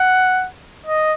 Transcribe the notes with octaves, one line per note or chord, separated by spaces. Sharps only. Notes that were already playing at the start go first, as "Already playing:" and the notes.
Already playing: F#5
D#5